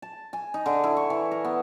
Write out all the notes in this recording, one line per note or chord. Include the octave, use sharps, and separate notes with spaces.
A5
G#5
D#4
D3
E4
C#6
E3
A#4
B3